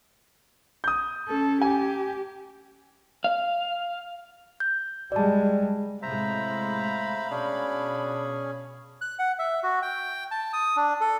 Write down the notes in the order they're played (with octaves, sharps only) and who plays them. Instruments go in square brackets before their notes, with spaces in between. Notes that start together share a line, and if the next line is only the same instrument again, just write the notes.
[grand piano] D#6 G6
[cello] C#4 A4
[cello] G4 [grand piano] G#5
[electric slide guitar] F5
[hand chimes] G6
[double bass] G3 G#3 [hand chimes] D5 A5
[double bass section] A2 C3 G#3 [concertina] C5 E5 A#5 [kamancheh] F5 B5
[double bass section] B2 [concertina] C#4 G#4 [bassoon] D4
[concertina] F#6
F#5
E5
F#4
G5
A5
D#6
D4
A4